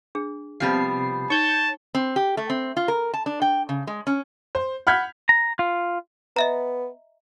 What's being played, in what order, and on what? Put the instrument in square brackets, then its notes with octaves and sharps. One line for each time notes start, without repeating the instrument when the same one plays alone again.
[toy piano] D4 G#4
[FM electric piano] C3 C7 [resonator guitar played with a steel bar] F3 G3 B3
[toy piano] D#4 [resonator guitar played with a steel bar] C#5 [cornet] A5 [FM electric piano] C#6 G6 G#6
[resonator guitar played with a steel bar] C4
G4
A3
C4
F4
A#4
A5
D4
G5
C#3
G#3
C#4
[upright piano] C5
F#5 B5 F6 G6 G#6 B6
[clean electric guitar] A#5
F4
[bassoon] B3 [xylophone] D#5 E5 A#5